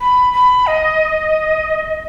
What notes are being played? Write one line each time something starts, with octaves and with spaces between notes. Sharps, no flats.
B5
B5
D#5